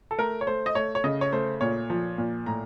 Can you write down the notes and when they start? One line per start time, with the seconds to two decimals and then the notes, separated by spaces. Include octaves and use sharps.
0.11 A4
0.19 A3 A#4
0.41 C#5
0.47 A3 C5
0.66 D#5
0.75 A3 C#5
0.95 C#5
1.04 C#3 D#5
1.21 C#5
1.32 A3 C5
1.61 A#2 C#5
1.90 F3
2.18 A#2
2.46 A2 A#5